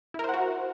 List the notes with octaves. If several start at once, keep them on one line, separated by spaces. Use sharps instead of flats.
E4 F#4 A#4 C5 F#5